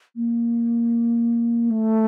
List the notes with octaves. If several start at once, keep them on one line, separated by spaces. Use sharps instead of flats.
A#3
A3